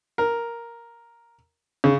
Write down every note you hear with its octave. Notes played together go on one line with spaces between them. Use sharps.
A#4
C#3